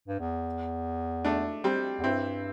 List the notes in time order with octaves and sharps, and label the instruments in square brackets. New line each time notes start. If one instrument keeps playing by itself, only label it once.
[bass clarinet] G2
E2
[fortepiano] A3 D4
G3 C4
[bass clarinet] E2
[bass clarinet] G2 [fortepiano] C4 E4